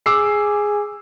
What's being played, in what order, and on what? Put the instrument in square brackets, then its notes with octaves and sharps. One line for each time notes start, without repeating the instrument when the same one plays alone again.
[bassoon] G#4 [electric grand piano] D6 E6 C7